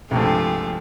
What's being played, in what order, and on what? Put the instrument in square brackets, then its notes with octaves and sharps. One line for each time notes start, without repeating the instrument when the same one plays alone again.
[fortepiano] C2 G2 [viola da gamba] F3 G#3 A3